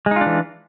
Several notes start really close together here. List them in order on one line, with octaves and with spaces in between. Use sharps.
G#3 D#4 F4 D4 E3